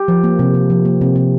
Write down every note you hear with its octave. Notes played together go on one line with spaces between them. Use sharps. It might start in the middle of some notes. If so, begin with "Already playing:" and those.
Already playing: G4
F3
A#3
C3
C3
F3
A#3
C3
C3